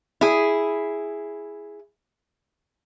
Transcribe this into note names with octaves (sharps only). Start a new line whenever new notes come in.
E4 G#4